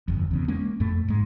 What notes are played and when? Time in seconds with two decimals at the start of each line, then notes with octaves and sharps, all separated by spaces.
0.08 G1 F2
0.31 E2 C#3
0.48 G#3 A#3 C#4
0.80 F2 A2 A3
1.08 G#2 G#3